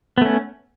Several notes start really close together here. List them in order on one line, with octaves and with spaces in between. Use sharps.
B3 A3 C#4